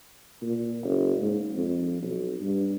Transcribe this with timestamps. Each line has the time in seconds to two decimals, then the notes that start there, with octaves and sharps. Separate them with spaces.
0.42 A#2
0.83 F#1
1.18 G#2
1.53 F2
2.02 B1
2.40 G2